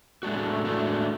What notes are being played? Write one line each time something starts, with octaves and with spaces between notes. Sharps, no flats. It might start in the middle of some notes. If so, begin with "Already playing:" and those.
A2 G#3 A3 D4 F#4
A2 G#3 D4 F#4